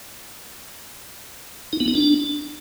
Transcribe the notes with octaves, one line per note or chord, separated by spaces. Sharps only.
D#4
B3
D#4
D4